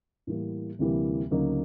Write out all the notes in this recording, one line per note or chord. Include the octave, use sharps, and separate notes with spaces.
A2 E3 G3 A#3
D2 C3 E3 G3 A#3
D2 C#3 F#3 A#3 D#4